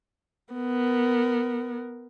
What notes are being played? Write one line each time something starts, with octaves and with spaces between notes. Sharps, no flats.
B3 A#4